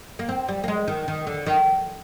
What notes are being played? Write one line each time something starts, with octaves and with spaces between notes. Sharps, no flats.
A#3
C4
G3
A#3
G#3
D#3
D#3
D3
D#3